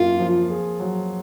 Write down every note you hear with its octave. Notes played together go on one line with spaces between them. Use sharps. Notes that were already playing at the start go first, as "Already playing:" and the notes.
Already playing: F#2 A#3 F4
F3
G#4
F#3